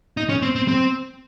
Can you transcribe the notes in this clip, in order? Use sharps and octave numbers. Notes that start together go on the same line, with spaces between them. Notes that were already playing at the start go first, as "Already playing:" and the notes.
D#4
C#4
C4
C4
C4